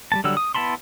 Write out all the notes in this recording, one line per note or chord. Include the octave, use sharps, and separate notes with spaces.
G3 A3 A5
D3 F#3 G3 E6
D#6
B3 E4 A5 B5 C6